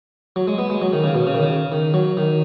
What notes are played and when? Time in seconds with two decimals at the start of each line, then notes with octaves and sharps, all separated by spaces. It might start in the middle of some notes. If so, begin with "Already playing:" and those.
0.36 F#3
0.48 G#3
0.58 B3
0.70 G#3
0.82 F#3
0.93 D#3
1.04 C#3
1.15 B2
1.27 C#3
1.34 D#3
1.43 C#3
1.72 D#3
1.94 F#3
2.17 D#3